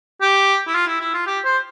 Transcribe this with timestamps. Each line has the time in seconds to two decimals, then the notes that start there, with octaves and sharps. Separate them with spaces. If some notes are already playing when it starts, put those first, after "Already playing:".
0.22 G4
0.67 E4
0.74 F4
0.87 E4
1.00 E4
1.14 F4
1.27 G4
1.45 C5